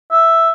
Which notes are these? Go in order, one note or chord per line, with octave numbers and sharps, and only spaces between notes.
E5